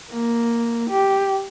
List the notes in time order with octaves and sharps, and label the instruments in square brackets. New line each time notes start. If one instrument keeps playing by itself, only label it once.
[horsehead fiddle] A#3
G4